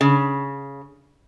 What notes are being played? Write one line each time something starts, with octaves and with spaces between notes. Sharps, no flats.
C#3